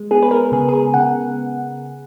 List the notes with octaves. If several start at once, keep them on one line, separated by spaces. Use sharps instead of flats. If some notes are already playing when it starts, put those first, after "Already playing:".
Already playing: G#3
B3 G#4
B4
A#4
C#3 G#4
G#4
A#4
C#3 F#5